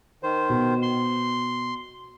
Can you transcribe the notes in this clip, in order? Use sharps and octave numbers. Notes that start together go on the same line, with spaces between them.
D#3 C5
B2
C6